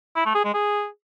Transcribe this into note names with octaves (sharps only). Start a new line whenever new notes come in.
E4
A3
G#4
G#3
G#4